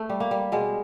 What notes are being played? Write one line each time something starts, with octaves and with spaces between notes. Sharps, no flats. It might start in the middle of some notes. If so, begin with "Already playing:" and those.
Already playing: A3
G3
A#3
G3
B2 G#3